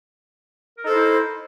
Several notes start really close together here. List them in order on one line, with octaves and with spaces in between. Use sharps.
A#4 D#4 A4 C5 E4